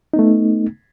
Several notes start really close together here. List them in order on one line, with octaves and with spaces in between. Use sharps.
D#4 B3 A3